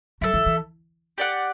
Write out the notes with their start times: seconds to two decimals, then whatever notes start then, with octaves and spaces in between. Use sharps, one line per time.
0.21 F#3 E4 A4 E5
0.34 E3
0.46 E3
1.18 G4 D5 F#5